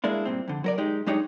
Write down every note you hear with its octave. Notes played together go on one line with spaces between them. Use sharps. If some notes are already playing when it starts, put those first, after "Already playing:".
G#3 A#3 D4 E4
G2 A#2 C4
F2 D3
F#3 A#4 D5
G#3 D#4 G4
F#2 G#3 D4 D#4 G4 C#5